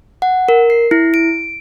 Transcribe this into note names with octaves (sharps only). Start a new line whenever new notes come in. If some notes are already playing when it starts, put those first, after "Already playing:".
F#5
A#4
C7
E4
D7